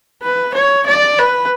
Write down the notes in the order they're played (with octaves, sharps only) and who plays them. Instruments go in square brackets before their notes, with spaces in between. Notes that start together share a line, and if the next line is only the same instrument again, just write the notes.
[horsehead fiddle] B4
C#5
D5
B4